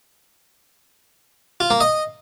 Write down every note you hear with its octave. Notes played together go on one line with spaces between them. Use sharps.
F4
A#3
D#5